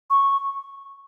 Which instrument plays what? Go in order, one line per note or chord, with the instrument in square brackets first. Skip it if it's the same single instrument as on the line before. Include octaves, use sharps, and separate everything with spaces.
[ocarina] C#6